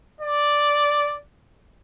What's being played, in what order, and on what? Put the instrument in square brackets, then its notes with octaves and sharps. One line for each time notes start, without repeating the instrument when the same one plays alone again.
[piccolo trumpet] D5